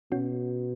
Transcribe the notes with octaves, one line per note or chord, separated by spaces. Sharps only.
B2 C#4 F#4